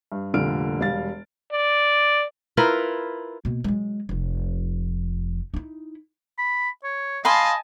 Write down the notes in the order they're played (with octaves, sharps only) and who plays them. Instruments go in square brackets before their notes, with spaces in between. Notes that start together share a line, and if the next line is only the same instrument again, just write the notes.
[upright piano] G2
F1 A#2 D3 G3 F6 D7
E1 G3 F5 A6
[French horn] D5
[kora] E4 F4 A#4 B4
[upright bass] B2 A#3
F#3 G#3
F1 F3
D#4 E4
[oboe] B5
C#5
[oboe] D#5 [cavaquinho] F5 B5 C6 [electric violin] G#5 A5